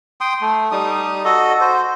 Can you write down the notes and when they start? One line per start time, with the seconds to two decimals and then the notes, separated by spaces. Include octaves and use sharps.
0.21 G5 C6 D#6
0.41 A3
0.72 G3 D#4 D#6
1.25 F#4 A4 D#5
1.61 F#4 C5